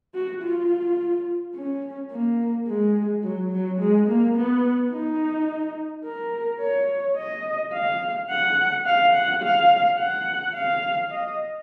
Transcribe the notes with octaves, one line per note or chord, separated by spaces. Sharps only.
F#4
F4
C#4
A#3
G#3
F#3
F#3
G#3
A#3
B3
D#4
A#4
C#5
D#5
F5
F#5
F5
F#5
F5
F#5
F5
D#5